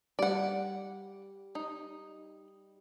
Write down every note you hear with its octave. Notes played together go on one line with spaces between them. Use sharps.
G3 D5 F#5
D#4